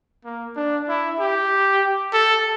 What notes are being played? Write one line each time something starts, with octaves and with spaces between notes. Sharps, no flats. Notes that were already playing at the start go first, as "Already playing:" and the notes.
A#3
D4
E4
G4
A4